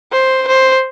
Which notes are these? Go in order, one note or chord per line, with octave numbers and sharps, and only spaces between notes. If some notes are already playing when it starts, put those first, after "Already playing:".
C5
C5